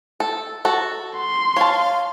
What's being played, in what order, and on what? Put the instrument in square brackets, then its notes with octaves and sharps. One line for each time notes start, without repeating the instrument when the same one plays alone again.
[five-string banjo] A4
F#4 A4
[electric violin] C6
[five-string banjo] C#5 A5 [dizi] F5